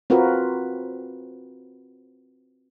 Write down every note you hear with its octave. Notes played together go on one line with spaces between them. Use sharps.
C4 F4 F#4 A#4 B4